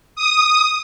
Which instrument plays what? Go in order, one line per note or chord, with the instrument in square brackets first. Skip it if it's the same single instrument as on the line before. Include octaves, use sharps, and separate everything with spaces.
[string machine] D#6